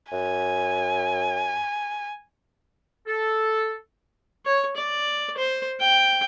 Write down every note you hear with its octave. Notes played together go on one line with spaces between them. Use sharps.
F#2 G#5
A4
C#5
D5
C5
G5